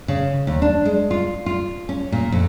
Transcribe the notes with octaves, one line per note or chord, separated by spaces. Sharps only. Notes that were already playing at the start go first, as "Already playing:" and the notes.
C#3
D#2
D4
G#3
F4
F4
C#4
A#2
F2